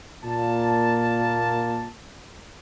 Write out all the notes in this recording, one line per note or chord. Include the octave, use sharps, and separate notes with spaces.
A#2 A#3 A5